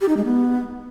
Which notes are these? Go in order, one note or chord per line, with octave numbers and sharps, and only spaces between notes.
G4
D#4
G#3
B3